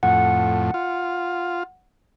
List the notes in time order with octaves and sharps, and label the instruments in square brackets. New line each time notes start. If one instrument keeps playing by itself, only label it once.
[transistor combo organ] F2 A2 [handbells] F#5
[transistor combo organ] F4